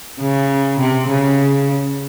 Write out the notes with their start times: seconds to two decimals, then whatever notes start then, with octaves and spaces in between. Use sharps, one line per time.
0.21 C#3
0.80 C3
1.09 C#3